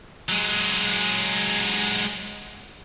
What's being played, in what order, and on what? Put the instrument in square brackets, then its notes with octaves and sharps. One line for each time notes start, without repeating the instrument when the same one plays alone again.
[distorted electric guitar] F#3 G#3